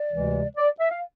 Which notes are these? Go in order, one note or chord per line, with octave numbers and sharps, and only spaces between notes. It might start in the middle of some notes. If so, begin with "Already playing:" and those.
Already playing: D5
D2 C3 E3 G#3
D5
E5
F5